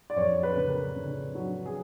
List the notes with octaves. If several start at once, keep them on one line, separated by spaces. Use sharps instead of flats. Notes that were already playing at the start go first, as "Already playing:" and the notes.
D5
F2 C#5
B4
C#3
A#4
C#3
F#3
G#4